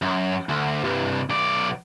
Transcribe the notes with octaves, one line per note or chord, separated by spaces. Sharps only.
F#2
D2
C2 G2
B1 D5